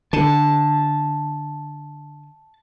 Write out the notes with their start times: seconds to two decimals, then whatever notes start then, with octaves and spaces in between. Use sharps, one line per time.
0.13 D3 A5